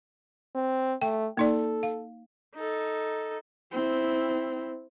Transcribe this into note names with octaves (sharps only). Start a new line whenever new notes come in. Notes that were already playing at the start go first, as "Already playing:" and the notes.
C4
A3 G5
A#3 D#4 A4 D5
F5
D#4 A4
C4 E4